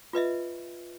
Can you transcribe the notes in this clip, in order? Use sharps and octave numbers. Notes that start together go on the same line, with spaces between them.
F4 B4 D#5 E5